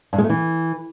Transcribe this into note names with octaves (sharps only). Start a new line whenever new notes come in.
G2
G#3
A3
E3